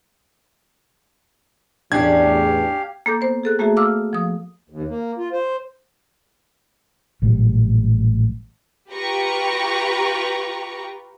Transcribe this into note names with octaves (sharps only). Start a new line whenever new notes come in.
A1 E2 C#4 D4 G4 F5 G#6
A#3 A4 D6 G6
B3 C5
G#4 A4 F#6
A3 A#3 F#4 G#4 E5
F5 D6 E6 F6
F3 D#6
D#2
A#3
F4
C5
A1 A#2 F#3 G3
F4 G4 B4 G5 A#5 C#6